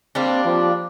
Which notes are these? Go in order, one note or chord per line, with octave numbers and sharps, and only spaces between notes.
G3 A#3 C4 D4
F3